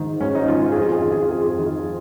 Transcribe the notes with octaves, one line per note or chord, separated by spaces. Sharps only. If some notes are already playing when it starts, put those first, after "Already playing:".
Already playing: G#2 D#3
G#2 C#4
D#4
D#3 F4
F4
F2 G#4
F4
G#4
D#3 F4
G#4
F4
F2 G#4
F4
G#4
D#3 F4